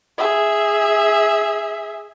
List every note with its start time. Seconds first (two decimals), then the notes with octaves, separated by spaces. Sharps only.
0.18 G#4 E5